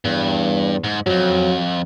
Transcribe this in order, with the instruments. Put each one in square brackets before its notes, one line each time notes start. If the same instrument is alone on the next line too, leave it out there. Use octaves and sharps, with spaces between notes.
[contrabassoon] E2 [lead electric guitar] G2
[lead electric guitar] G#2
[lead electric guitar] F2 G#2 [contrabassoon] F#3